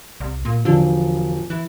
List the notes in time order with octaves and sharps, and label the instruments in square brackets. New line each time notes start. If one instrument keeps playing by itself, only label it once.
[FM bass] C2
A#2
[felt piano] E1 F3 [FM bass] D3
[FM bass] E3